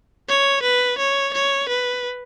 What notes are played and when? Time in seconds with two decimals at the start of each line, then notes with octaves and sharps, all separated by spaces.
0.29 C#5
0.63 B4
0.98 C#5
1.34 C#5
1.69 B4